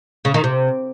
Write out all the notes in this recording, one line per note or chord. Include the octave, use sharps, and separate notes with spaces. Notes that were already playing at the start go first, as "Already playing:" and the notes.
C#3
D#3
C3